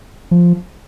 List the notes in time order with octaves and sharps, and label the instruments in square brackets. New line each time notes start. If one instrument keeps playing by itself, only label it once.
[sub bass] F3